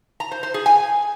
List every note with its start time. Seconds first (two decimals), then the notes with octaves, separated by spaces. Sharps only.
0.20 A#5
0.31 C5
0.43 C5
0.54 G#4
0.66 G#5